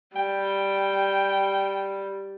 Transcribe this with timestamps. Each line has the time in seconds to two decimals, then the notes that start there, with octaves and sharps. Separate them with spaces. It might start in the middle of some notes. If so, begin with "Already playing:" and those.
0.16 G3 G5